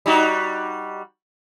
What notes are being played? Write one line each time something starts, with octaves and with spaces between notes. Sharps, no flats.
G3 D#4 F#4